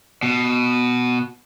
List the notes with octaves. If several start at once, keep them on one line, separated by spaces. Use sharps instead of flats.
B2